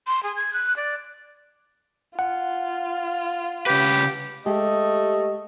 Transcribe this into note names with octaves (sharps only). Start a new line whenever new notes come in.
C6
G#4
G#6
F#6
D5
F4 F#5
C#3 G4 B4
G#3 A3 G4 D#5